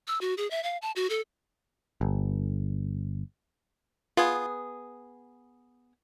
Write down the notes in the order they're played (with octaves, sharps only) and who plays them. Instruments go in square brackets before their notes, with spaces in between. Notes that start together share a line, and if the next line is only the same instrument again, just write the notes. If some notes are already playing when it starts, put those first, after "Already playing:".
[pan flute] E6
F#4
G#4
E5
F5
A5
F#4
A4
[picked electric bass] G1
[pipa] B3 G#4 [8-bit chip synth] F4